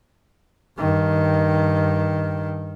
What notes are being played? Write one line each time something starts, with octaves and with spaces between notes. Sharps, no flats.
G2 D#3